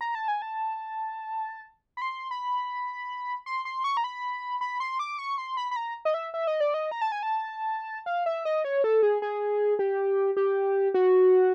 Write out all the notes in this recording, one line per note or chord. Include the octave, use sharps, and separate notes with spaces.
A#5
A5
G#5
A5
B5
C6
B5
C6
C6
C#6
A#5
B5
B5
C6
D6
C#6
C6
B5
B5
A#5
D#5
E5
E5
D#5
D5
D#5
A#5
A5
G#5
A5
F5
E5
D#5
C#5
A4
G#4
G#4
G4
G4
F#4